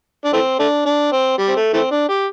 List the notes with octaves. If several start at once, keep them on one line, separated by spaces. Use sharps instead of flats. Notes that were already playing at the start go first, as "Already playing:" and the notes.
D4
E3 A3 C4
A3 D4
D4
C4
G3
C4
A3
E3 A3 C4
D4
G4